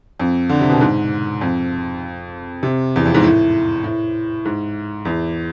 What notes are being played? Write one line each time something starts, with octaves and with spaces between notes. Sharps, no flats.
F2
D3
C3
B2
G#2
F2
C3
E2
F2
G#2
A2
A2
G#2
E2